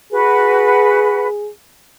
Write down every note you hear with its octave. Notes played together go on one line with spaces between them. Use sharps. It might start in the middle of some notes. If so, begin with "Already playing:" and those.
F#4 G#4 B4